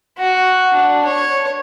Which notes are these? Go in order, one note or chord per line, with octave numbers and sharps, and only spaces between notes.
F#4
D4
C#5